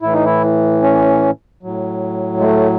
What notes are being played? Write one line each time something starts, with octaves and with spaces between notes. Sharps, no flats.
A2 E3 E4
D#4
E4
C#4
A2 F#3
G#3
A3